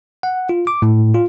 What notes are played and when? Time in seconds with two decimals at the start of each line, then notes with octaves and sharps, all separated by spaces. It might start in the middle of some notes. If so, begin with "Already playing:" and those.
0.23 F#5
0.49 F4
0.67 D6
0.82 A2
1.14 F4